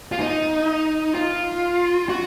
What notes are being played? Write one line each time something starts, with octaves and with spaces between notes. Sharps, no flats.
F4
D#4
F4
F#4